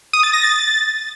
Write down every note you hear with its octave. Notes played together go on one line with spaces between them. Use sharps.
D#6
A6
A#6
A6